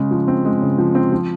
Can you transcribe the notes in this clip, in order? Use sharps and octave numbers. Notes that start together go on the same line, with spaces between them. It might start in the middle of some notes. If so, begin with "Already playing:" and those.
Already playing: C#3 G#3
F3
C4
G#3
C#3
F3
C4
F3